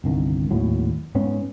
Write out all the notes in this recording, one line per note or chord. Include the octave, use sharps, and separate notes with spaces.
G1 C2 D#3
G#1 D#2 A2 F#3
G#2 B3 C#4